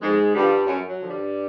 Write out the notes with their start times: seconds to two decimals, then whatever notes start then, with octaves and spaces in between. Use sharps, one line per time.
0.01 F2 G#2 G#3
0.34 G2 D3 F3 G3
0.67 F#2
0.88 F#3
0.99 D3 F3
1.10 G2 G3